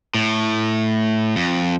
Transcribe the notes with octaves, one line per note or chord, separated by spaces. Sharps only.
A2
F2